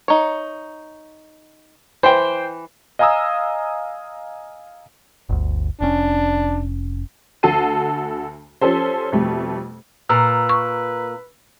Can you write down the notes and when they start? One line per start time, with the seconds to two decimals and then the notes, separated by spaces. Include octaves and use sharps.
0.08 D#4 C#5
2.03 E3 C5 G5
2.99 D#5 F5 G#5 A#5 D#6 E6
5.29 G1 D2
5.81 F1 C#4 D4
7.43 D2 F#4 A4 A5 C7 D#7
8.61 F3 C#4 G4 A4 C5
9.12 F2 B2 G3 A3
10.10 A#2 A#4 B4 A#5 E6
10.49 C#6